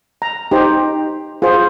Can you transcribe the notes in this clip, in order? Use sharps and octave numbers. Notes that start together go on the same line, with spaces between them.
A#5
D#4 G4 C5
F4 G#4 C5